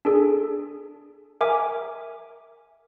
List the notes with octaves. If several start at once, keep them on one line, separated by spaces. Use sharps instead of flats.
D4 G#4 A4
A#4 E5 G#5 D6